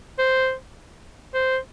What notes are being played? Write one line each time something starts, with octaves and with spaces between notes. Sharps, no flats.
C5
C5